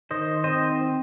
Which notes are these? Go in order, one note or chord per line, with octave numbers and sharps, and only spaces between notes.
D#3 C5 D#5
C4 C5 D#5